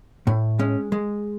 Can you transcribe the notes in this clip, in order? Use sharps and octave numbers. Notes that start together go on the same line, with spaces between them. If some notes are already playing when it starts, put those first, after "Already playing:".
A2
G#3 C#4
G#3